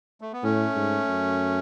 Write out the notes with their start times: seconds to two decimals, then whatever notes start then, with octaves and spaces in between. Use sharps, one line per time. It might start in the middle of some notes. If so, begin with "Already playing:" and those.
0.21 A3
0.33 B3
0.43 A2 A3 C#4
0.76 G#2
1.09 F#2